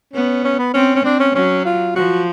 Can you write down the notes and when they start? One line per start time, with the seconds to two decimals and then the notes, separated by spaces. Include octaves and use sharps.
0.13 B3 C#4
0.44 C#4
0.59 B3
0.74 C4 C#4
0.96 C#4
1.04 C4 D4
1.20 C#4
1.35 F#3 C#4
1.65 F4
1.95 F3 F#4